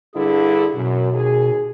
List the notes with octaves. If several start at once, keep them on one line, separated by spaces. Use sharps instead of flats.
G2 D3 E4 G#4
F#2 B2
D#2 G#4